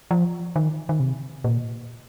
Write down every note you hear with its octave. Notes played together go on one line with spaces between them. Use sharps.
F3
D#3
D#3
C3
A#2